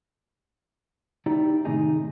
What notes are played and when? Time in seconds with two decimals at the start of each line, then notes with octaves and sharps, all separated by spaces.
1.26 D#4 E4 G4 D5
1.65 A2 C3 D#3 D#4 G#4